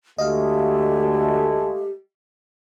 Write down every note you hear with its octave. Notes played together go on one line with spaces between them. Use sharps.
D2 G#3 A3 G4 D#5 F5